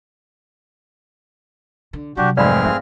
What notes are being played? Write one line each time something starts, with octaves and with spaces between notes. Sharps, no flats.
D3
C3 F#3 D4 F#4 G4
F1 G#2 C4 G#4 D5 F5 B5 F6
F3 E5 F5